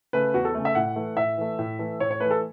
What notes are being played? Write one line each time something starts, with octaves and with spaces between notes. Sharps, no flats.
C#3 A3 B4
E2 F#4
A4
C#3 A3
E5
A2 F#5
E3 A3
A2 E5
E3 A3
A2
E3 A3
A2 C#5
C#5
E3 A3 B4
A4